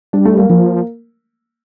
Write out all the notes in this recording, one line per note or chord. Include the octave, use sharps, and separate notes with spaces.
G3 D4
A3
A#3
F3 A#3